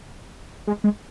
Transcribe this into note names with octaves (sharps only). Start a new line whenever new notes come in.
G#3
G#3